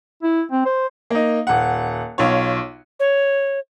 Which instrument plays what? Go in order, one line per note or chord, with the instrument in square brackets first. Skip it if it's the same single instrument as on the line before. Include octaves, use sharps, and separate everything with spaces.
[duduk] E4
C4
C5
[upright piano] A#3 D#4
D#1 F#5
B1 F4 C#5
[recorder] C#5